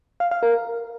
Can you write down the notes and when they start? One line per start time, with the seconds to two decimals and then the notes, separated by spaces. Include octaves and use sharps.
0.20 F5
0.31 F5
0.43 A#4